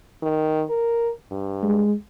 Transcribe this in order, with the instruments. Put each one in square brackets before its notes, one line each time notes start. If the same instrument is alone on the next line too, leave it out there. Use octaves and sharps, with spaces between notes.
[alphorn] D#3
A#4
G2
[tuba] G#3